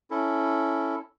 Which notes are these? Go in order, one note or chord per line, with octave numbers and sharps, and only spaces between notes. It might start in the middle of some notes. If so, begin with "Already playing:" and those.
C#4 E4 A4